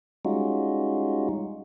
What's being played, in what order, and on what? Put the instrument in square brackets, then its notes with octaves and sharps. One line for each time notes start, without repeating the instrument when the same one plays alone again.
[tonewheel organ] G3 G#3 C#4 D#4 F4 F#4